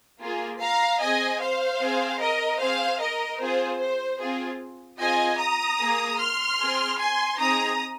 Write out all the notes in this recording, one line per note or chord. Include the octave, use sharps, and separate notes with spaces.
A#3 F4 G#4
F5 A#5
C4 G#4 D#5 G#5
C5 F5
C4 G#4
A#4 D#5
C4 G#4 C5 F5
A#4 D#5
C4 F4 G#4 C5
C5
C4 F4 G#4
C4 F4 G#4 D#5 G#5
A#5 D#6
A#3 G#4
C6 F6
C4 G#4
G#5 C6
C4 D#4 G#4 A#5 D#6